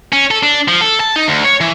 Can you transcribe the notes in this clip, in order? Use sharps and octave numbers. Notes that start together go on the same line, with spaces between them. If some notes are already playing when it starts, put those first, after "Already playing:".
C#4
A4
D4
F3
A4
A5
D#4
D2
C#5
E3